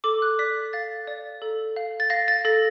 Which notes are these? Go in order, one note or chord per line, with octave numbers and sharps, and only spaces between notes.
A4 D6
F#6
D5 B6
F5 A6
D5
A4
F5
A6
F5 A#6
A6
A4 A#6